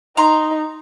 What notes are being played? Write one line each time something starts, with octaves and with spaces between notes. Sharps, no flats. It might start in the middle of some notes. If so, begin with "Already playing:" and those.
D#4 A#5 C6